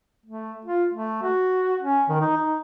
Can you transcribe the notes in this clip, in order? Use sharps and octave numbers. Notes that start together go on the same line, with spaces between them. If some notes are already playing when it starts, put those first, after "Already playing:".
A3
F4
A3
F#4
C#4
D#3
D#4
D#4